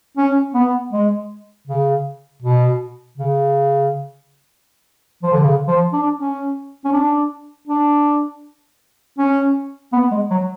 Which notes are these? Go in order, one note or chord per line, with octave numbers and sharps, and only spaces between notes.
C#4
B3
G#3
C#3
B2
C#3
F3
D3
C#3
F3
D4
C#4
C#4
D4
D4
C#4
B3
G#3
F#3